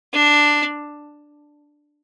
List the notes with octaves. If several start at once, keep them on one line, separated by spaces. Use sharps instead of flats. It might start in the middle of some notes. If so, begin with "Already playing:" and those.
D4